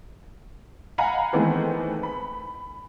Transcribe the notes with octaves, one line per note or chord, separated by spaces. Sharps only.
D#5 F5 F#5 G#5 A#5 B5
D#3 E3 G#3 A3 B3 C4
B5